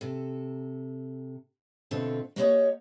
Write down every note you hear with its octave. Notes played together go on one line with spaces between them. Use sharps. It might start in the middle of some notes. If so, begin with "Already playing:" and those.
C3 A4
B2 D3 A3 C4 F4 A4
A#3 F#4 G4 C5 C#5 D#5